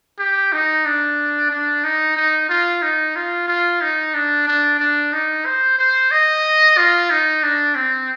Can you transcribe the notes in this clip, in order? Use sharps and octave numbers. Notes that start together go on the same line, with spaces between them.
G4
D#4
D4
D4
D#4
D#4
F4
D#4
F4
F4
D#4
D4
D4
D4
D#4
C5
C5
D#5
F4
D#4
D4
C4